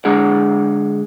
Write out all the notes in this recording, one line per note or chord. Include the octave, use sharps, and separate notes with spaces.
D3 G#3 D4 G#4 F#5